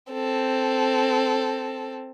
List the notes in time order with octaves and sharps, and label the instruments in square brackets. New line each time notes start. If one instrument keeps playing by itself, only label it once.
[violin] C4 A4